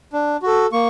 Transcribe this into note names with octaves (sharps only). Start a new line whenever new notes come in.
D4
F#4 A4
A#3 C#6